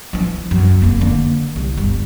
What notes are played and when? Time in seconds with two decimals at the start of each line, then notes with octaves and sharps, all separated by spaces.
0.13 E3 F3
0.51 F#2
0.82 F1 A#3
1.01 D3 A#3
1.56 C2
1.77 G1